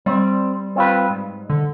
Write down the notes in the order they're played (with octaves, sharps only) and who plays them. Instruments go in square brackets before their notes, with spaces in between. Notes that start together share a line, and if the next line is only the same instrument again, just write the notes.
[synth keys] G3 [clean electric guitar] C4
[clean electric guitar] C4 F4 B4
G#2
[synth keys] D3